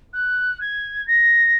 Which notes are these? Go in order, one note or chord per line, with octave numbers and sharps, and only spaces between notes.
F#6
G#6
A#6